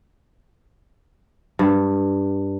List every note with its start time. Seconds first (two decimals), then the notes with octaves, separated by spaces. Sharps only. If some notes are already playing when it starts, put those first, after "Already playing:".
1.59 G2